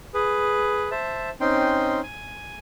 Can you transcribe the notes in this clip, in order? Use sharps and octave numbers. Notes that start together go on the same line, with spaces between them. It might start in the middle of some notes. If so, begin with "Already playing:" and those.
G#4 B4
C5 E5 A5
C4 C#4 D#4 G5 C6
G#5